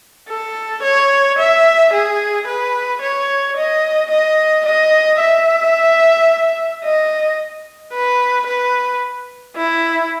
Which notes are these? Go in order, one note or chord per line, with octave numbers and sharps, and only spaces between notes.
A4
C#5
E5
G#4
B4
C#5
D#5
D#5
D#5
E5
D#5
B4
B4
E4